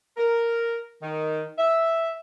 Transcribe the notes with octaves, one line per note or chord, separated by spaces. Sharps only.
A#4
D#3
E5